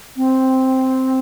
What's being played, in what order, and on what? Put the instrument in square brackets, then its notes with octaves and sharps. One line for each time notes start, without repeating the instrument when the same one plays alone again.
[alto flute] C4